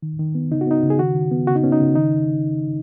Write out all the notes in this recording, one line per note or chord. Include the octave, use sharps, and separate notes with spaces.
D#3
D#3
B3
C#3 D#4
F#4
B3 D#4
C#3
G#4
D#3 F#4
D#3
B3
C#3 F#4
D#4
B3 C#4
D#4
C#3
D#3 D#4